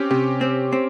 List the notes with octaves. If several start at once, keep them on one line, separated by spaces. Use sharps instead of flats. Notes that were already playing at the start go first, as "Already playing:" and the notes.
Already playing: C4 C#4 G4
C3 G4
C4
C4